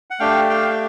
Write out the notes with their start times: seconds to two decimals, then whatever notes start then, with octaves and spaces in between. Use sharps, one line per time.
0.10 F#5
0.20 A3 D4 G4 F5 G5
0.49 F5 G5
0.70 G5